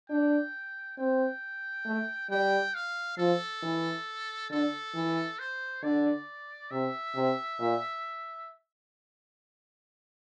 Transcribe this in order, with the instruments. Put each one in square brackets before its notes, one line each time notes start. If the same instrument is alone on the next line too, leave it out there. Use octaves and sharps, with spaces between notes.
[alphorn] D4 [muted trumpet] G5
[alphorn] C4 [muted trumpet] G5
[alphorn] A3
[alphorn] G3 [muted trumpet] G5
[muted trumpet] F5
[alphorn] F3 [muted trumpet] A4
[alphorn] E3
[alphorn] D3 [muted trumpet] A4
[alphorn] E3
[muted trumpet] C5
[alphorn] D3 [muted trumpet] D5
[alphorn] C3 [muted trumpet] E5
[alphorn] C3
A#2